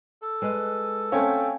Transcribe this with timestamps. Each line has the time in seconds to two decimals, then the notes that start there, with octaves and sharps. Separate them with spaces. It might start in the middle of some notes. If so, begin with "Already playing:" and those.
0.22 A4
0.42 G#3 B4 D#5
1.12 A3 C4 C#4 F5 G5 G#5